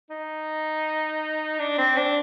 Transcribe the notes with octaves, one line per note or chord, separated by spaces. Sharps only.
D#4
D4
C4
D4